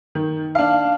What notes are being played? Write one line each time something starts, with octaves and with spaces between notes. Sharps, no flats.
D#3
D4 F5